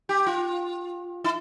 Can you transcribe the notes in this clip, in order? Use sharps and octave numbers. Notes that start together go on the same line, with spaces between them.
G4
F4
E4